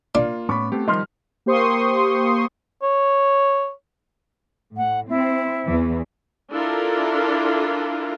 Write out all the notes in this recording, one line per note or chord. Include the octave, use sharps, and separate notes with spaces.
A#3 D4 F4
A2 B3 C#4 B5 C#6 D6
A3 B3 C4 G4
D#3 F3 G3 D#5 C6 F6
A#3 G4 C5 C6 C#6 D#6
C#5
A2 F#5
C4 E4
E2 E3
D4 E4 F4 A4 A#4